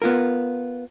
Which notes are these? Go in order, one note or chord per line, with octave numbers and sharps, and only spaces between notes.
B3 F4 A#4